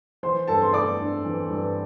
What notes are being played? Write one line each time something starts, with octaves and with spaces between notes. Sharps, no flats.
E3 C5 C6
G2 A4 A5
C6
A3 D5 D6
D4
E3
G2